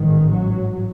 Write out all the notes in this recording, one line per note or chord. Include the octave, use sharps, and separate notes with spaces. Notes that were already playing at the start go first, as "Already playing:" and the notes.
Already playing: A1 G#2 D#3
F#3